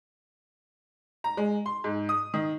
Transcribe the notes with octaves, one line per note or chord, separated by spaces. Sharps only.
A#5
G#3
C6
G#2
D#6
D#3